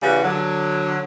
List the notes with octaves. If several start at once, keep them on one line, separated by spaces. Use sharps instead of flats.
C#3 E3 G3 F#4 B4
D3 F#3